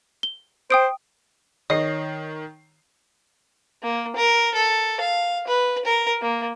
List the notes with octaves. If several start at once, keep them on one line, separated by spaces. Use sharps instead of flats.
G7
C5 G5 D#6 D7
D#3 C#5 D#5 C7
A#3
A#4
A4
F5
B4
A#4
A#3